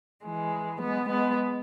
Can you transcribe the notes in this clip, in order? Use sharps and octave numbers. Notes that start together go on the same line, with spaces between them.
E3 G#3
G#3 B3
G#3 B3